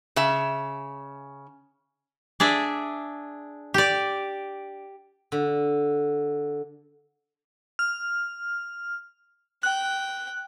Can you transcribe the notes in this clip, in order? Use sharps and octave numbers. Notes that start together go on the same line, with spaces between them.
C#3 E5
D4 G#4 D5 E5
G4 D5
D3
F6
G5 F#6